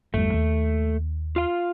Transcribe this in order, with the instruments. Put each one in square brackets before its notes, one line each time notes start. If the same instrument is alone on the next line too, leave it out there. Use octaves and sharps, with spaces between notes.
[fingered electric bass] G1 E2 G3 [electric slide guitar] A3
[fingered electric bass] D#2
[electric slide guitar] F4 F5